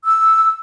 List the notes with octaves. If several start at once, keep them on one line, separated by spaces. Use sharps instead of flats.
E6